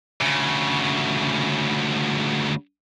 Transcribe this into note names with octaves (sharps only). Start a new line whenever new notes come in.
D2 C#3